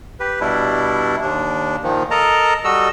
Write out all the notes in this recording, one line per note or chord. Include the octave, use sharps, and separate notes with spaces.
G4 B4
B2 G3 D4 E4
D#2 D4
A#2 D#3 F3
A4 A#4 D#5 A5 A#5
G3 F#4 A4 D#5 E6